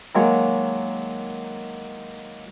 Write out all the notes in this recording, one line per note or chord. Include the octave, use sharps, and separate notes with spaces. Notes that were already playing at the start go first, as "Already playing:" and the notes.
D#3 F#3 G#3 A#3 C#5